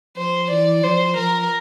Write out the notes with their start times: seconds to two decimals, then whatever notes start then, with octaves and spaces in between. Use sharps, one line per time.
0.17 F3 C5
0.50 E3 D5
0.83 F3 C5
1.17 F3 A#4